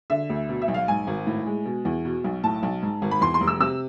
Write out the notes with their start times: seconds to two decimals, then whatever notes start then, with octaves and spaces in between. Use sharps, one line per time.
0.10 D3 E5
0.30 D2
0.49 B2
0.62 E5
0.68 B1
0.74 F5
0.88 G#2 G#5
1.07 G#1
1.27 A2
1.46 G#3
1.65 B2
1.85 E2
2.05 B2
2.24 B1
2.44 A2 A5
2.63 B1
2.83 G#2
3.02 G#1
3.11 B5
3.21 E2 C6
3.34 C6
3.41 F1
3.47 E6
3.60 C3 E6